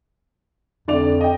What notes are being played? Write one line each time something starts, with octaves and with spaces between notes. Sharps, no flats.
F2 D3 D5 F7
D#5 G5